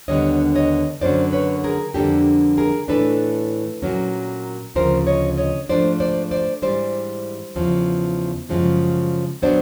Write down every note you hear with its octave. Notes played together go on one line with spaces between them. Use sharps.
D#2 D3 G3 B3 D4 C#5 D#5
C#5 D#5
F#2 D3 F#3 A#3 C#4 C5 D5
B4 C#5
G#4 A#4
F2 D3 G3 A#3 D4 G4 A4
G#4 A#4
A2 E3 A3 D4 A4 B4
A#2 F#3 A#3 C#4
D2 C#3 F3 A#4 C5
C#5 D#5
C#5 D#5
G#2 F3 A3 D4 C5 D5
C5 D5
C5 D5
G#2 E3 G3 C5 D5
E2 C#3 F3
F#2 C#3 F3 G#3
A#2 F#3 B3 D4 C5 D5